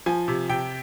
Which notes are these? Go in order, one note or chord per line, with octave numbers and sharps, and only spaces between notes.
F3 G#5
C3
C3 G5